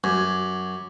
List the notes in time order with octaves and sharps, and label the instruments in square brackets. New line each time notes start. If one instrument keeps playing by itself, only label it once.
[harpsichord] F#2 [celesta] D6 G#6